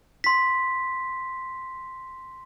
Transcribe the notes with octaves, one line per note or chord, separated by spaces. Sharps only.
C6 B6